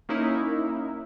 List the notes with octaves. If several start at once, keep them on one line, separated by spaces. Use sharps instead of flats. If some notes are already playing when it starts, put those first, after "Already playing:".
A#3 C#4 D#4 E4 A#4